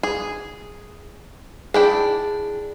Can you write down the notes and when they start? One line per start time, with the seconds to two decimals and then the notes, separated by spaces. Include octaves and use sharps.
0.03 G#4
1.74 D4 E4 G#4 G5